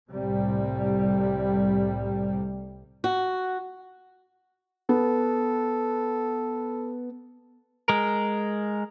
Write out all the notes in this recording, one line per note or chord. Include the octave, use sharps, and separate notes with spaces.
C2 A2 C3 G3
F#4
B3 A4
G#3 A#4